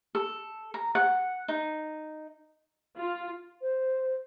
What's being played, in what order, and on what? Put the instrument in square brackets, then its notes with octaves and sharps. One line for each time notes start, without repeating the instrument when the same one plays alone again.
[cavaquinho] A4
A#5
F#5
D#4
[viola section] F4
[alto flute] C5